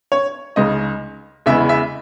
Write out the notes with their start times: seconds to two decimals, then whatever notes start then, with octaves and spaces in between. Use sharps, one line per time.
0.12 C#5
0.56 C#2 C#3 G#3 D#4 D#5
1.46 E2 C#3 G#3 B3 E4 E5
1.69 E5